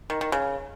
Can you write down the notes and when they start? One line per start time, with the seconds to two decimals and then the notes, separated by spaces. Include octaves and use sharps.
0.10 D#3
0.21 D#3
0.32 C#3